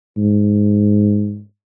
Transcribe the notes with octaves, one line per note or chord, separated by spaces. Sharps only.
G#2